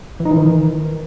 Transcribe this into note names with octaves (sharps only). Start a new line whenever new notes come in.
E3
D#4
E3
D#3